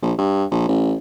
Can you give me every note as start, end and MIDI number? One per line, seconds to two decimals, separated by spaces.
0.02 0.13 34
0.18 0.45 43
0.51 0.65 34
0.69 0.95 33